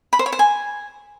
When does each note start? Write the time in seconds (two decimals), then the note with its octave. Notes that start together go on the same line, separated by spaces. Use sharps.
0.13 B5
0.19 C5
0.26 C#5
0.32 C5
0.39 G#5